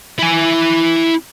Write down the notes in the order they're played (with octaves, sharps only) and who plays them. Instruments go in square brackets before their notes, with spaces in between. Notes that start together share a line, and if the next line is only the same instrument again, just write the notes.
[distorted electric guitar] E4 G#5